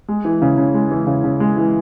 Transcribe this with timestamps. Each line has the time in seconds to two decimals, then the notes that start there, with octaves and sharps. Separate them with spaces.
0.08 G#3
0.25 E3
0.42 C#3
0.58 C#3
0.74 G#3
0.91 E3
1.07 C#3
1.24 C#3
1.40 G#3
1.57 E3